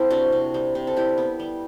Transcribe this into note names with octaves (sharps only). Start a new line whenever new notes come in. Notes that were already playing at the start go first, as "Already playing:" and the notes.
Already playing: C4 E4 A4 C5
C3 D4 F#4
C3
G3
C3
A4
G3 E4 G4
B3
G3